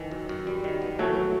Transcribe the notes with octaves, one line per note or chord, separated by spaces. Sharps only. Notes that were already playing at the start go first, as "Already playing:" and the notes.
Already playing: D#3 E3
F#2
F#2
G3
D#3
B3
E3 F#3 A3